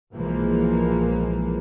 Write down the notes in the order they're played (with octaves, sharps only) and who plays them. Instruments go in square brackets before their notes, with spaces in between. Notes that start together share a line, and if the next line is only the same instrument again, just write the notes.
[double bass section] B1 A#2 E3 F3 G#3 A#3